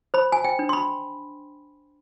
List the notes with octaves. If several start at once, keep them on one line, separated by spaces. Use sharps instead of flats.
C5 B5
G#5
G5
D4
C6
B5